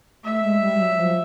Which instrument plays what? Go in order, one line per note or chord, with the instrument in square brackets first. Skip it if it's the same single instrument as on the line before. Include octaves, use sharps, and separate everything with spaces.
[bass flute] A3 [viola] E5
[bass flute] G#3
G3
F#3
F3